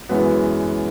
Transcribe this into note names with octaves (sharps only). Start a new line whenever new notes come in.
F#2 E3 G#3 B3 F#4